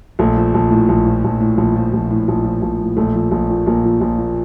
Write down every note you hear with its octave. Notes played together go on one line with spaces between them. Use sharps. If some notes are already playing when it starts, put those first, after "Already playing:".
A#1 A3
F3
A#1
A2
A#1
F3
A#1
A2
A#1
F3
A#1
A2
A#1
F3
A#1
A2
A#1 A3
F3
A#1
A#2
A#1 A#3
F3
A#1
A#2